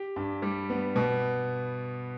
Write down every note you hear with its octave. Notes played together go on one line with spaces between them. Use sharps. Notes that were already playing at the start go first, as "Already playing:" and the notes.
Already playing: G4
G2
G3
B3
B2